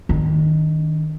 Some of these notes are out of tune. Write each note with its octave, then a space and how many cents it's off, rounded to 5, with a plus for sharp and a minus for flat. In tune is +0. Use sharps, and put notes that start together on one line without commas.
D#3 +0 D4 -40